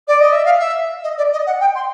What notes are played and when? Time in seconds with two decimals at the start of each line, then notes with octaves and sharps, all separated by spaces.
0.07 D5
0.20 D#5
0.32 E5
0.45 F5
0.59 E5
1.03 D#5
1.17 D5
1.32 D#5
1.46 F#5
1.60 G5
1.75 C6